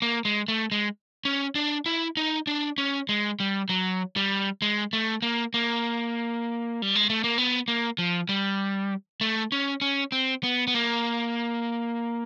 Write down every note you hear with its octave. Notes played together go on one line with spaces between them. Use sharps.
A#3
G#3
A3
G#3
C#4
D4
E4
D#4
D4
C#4
G#3
G3
F#3
G3
G#3
A3
A#3
A#3
G3
G#3
A3
A#3
B3
A#3
F3
G3
A3
C#4
C#4
C4
B3
B3
A#3